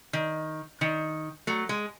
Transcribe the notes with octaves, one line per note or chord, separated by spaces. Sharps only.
D#3
D#3
F#3 A3
G#3